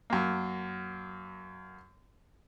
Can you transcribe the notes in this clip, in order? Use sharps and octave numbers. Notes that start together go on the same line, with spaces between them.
F#2 A#3